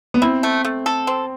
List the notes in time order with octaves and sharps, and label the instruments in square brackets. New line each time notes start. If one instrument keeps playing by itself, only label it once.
[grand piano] B3
[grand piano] C4 [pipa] E4
[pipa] A3
A3
A4
C4